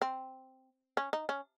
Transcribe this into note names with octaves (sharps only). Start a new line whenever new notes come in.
C4
C#4
D#4
C#4